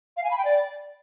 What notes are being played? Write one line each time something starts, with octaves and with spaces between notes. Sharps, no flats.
F5
G#5
B5
G5
D5